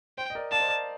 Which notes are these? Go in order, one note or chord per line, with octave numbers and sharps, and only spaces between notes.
C5 G5
D#5
A#4 D5
D5 F5 A5
C5 D#5
A#4 D5